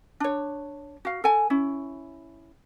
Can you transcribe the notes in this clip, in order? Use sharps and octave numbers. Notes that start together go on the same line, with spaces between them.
D4 C#5
F#4 F5
A4 G#5
C#4 E4